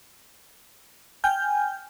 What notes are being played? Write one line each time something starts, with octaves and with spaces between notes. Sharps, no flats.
G5 G#5 F6 G6